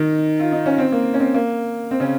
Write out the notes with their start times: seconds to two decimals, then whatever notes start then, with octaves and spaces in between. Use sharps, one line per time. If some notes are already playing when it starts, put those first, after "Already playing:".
Already playing: D#3 D#4
0.40 F4
0.52 D#4
0.66 C#4
0.78 C4
0.92 A#3
1.14 C#4
1.20 C4
1.34 A#3
1.91 C4
2.00 C#3 C#4